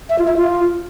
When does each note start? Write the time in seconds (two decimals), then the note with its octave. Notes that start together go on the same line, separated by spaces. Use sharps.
0.10 E5
0.19 F4
0.28 E5
0.37 F4